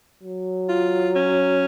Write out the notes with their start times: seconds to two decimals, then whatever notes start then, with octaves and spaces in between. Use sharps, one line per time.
0.23 F#3
0.69 F4
1.16 C#4